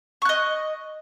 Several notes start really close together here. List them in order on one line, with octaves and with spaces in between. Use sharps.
C#6 F#6 D#5